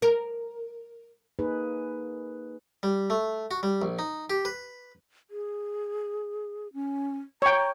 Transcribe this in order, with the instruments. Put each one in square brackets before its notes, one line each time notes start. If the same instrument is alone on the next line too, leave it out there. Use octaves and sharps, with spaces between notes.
[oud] A#4
[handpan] A#3 D#4 G#4 B4
[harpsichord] G3
A3
F#4
G3
A#1
D#4
G4
B4
[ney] G#4
C#4
[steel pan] C#5 G5 [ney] A#5